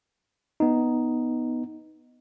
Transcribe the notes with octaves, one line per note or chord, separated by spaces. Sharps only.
B3 D#4